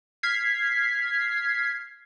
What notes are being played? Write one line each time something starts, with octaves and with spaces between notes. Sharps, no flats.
F6 G#6 B6 C7